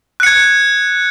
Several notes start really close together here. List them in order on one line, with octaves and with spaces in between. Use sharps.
F#6 C#7 G#6